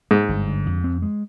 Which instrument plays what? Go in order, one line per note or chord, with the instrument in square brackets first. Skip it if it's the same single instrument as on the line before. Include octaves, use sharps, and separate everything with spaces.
[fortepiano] G#2 [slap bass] G#3
[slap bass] G1
D3
F2
C4
G#3